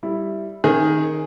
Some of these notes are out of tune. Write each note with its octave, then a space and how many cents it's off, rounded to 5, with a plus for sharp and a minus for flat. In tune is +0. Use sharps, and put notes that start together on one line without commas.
G3 +0 E4 +0
D#3 +0 C#4 -40 G#4 +0